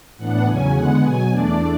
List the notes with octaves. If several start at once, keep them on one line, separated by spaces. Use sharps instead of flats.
A2 E3 B3 D4 F#5
E2 C#3 F#3 C#4 G#5
E2 D3 G#3 B3 F#5
B2 F#3 B3 G#5
E2 B2 A3 D4 D5